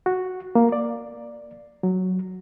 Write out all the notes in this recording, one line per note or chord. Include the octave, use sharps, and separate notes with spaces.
F#4
A#3
D5
F#3